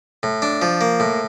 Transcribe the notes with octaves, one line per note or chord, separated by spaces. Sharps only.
A2
D4
F3
A#3
A2